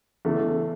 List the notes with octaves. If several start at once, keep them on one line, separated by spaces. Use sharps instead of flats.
E2 C#3 E3 A3